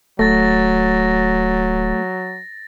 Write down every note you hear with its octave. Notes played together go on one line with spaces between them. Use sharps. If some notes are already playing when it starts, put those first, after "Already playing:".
D1 F#3 A3 A6 A#6